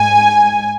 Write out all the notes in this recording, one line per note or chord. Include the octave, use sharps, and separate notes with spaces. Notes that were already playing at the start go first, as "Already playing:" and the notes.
Already playing: G#2 G#3 G#5